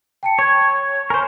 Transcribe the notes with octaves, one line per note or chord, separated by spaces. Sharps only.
G5 A5 C#7
C#5 G#6
A#4 C5 G#5 C#6